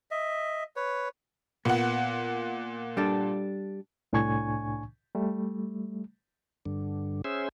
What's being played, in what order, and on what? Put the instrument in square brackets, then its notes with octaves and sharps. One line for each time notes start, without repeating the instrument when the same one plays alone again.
[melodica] D#5 E5
B4 C#5
[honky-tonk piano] A#2 F#5 [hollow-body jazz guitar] B3
[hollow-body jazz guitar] G3 D4 A4
[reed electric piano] C2 A2 D4 G#5 C#6 G#6
G3 A3
[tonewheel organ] G2 D3
C#4 G#4 C5 E5